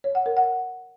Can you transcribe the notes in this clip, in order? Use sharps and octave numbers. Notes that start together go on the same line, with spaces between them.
C#5
F#5
A#4
F#5